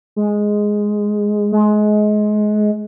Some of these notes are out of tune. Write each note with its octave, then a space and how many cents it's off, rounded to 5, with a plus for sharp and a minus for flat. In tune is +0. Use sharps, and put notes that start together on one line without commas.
G#3 +0
G#3 +25